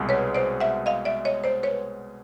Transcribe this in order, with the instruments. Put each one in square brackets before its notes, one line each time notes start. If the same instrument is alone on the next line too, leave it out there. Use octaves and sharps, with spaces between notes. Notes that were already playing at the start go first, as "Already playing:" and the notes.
Already playing: [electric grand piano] C2 B2 G#3
[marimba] B4 C#5
C5 D5
E5 F#5
D#5 F5
D5 E5
C#5 D#5
C5 D5
B4 C#5